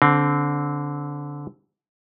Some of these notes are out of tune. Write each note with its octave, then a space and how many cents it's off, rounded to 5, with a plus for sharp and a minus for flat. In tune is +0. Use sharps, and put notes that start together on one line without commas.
D3 -20 C4 +0